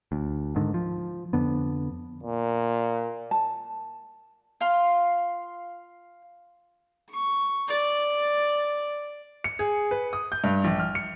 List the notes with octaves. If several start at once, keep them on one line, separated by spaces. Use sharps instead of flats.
D2
G#2 D3 D#3
F3
F2 D3 B3
A#2
A5
F4 F5 C6
C#6
D5
C#7
G#4
B4
D#6
G6
G2
A#1
F6
C#7